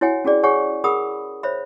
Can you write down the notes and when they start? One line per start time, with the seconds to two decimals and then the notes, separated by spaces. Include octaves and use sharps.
0.01 E4 F#4 C#5 F#5 G#5
0.25 C#4 F#4 G#4 D5
0.43 G#4 C#5 F#5 G#5 C#6
0.84 G#4 A#4 F#5 B5 D#6
1.43 C5 C#5 E5 B5